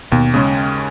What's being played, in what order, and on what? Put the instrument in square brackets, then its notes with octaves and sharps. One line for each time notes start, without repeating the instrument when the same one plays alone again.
[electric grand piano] D#2 [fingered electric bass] B2
[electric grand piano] C#3 G#3 C#4